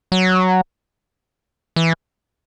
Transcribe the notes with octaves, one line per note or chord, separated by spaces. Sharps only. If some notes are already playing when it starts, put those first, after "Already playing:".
F#3
E3